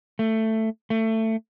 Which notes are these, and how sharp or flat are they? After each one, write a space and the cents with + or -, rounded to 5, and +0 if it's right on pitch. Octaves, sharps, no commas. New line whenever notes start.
A3 +10
A3 +20